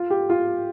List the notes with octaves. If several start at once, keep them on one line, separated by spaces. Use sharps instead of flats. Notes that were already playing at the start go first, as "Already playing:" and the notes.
Already playing: F4
G4
F4